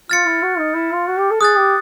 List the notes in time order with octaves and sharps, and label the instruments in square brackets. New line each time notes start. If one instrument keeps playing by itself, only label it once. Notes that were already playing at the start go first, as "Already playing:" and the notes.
[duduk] F4 [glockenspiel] F6 A6 C#7
[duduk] E4
F#4
D#4
E4
F4
F#4
G4
A4
[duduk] G#4 [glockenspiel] D#6 F#6 A6
[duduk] G4